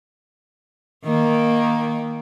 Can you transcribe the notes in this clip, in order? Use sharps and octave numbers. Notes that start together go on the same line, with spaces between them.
D#3 A#3